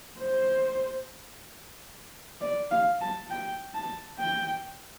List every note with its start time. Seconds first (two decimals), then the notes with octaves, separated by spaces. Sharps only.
0.20 C5
2.41 D5
2.71 F5
3.01 A5
3.30 G5
3.74 A5
4.19 G5